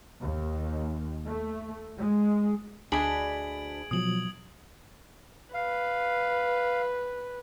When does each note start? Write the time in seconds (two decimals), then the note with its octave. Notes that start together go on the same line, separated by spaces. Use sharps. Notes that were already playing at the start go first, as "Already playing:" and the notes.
0.20 D#2
1.26 A3
1.98 G#3
2.92 D2 D4 G#4 D#5 B5 G#6 D7 F#7
3.91 B2 F3 F#3 D#6 F#7
5.54 B4 F5